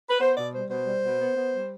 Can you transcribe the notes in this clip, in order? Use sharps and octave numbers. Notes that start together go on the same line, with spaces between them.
B4
B3 C5
B2 D5
G3 C5
B2 C5
G3
B2
B3
B3
G3